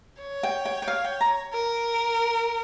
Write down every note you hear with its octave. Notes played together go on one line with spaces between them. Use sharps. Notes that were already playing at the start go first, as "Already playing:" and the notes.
C#5
G5
G5
G5
F5
G5
A#5
A#4